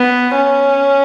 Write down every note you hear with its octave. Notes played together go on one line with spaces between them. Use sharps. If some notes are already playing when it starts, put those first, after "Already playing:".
Already playing: B3
C#4